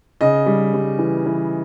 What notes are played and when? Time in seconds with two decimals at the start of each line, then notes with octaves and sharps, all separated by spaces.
0.21 C#3 D#5
0.46 G3
0.74 G3
0.99 E3
1.26 E3